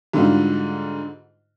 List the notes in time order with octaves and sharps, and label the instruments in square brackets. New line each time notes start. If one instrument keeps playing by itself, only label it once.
[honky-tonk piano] G#2 D3 G3 D#4 F4 F#4